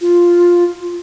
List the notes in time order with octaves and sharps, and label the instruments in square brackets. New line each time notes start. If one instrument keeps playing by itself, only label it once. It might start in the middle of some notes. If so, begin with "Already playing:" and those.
[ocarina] F4